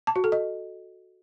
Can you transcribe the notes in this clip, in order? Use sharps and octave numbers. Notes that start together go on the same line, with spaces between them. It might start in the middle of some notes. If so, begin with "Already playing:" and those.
A5
F#4
A4
D#5